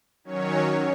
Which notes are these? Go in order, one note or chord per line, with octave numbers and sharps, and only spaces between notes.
D#3 F#3 C#4 C#5